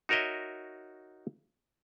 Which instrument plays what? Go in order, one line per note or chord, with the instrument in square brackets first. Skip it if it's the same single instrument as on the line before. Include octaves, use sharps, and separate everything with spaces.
[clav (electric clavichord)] D#4 F#4 A#4 C#5 D#5 E5